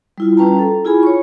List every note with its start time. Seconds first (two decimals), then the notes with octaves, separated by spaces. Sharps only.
0.18 G3 E4 F4
0.37 G3 C#4 B4 G5 A5 A#5
0.59 A4
0.85 E4 F4 G#4 G#5 B5
1.03 C#5 C#6